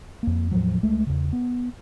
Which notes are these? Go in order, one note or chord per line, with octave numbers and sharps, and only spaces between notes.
F2 A#3
E2 A2 F3 F#3
C#2 G#3 A3
E2 C#3
B3